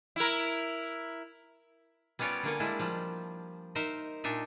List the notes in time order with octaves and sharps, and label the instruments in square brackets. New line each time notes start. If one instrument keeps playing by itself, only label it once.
[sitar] E4 A#4
[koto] G3 B3 C#4 F4 C#5 D5
D3 A#3 G#5
G3 G#3 D4 E4
F3 G3
D#4 A#4 C5 E5
A#2 D4 D#4 E5